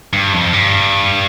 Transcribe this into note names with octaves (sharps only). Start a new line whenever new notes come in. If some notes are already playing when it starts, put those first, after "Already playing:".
G2
F2
G2